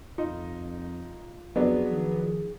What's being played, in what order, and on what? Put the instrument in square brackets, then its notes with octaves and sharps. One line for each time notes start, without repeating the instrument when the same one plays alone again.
[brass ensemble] F2 [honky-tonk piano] D#4 [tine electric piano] F4
[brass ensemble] F2 [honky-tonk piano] F#3 B3 D4 [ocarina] G#4
[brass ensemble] D#3 F3